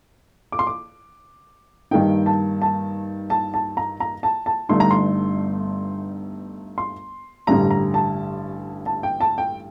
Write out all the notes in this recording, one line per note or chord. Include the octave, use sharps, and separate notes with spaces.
D6
C6
D6
G2 D#3 A#3 D#4 G5
A5
A5
A5
A5
A#5
A#5
A5
A5
G1 G2 D3 A3 D#4 C6
A#5
C6
C6
A1 G2 D3 G3 A#5
A#5
A5
A5
G5
A5
G5